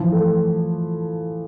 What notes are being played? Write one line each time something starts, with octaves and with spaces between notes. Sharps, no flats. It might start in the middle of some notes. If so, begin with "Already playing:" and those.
Already playing: E3 F3
A3